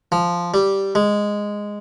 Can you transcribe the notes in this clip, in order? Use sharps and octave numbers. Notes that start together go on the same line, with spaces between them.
F3
G3
G#3